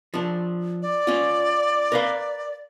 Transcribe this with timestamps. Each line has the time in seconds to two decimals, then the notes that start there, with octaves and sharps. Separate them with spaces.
0.14 F3 D4
0.82 D5
1.07 C#4 F4
1.92 A#4 B4 F5